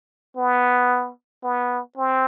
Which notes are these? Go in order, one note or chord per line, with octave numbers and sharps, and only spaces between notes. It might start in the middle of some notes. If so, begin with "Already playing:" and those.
B3
B3
C4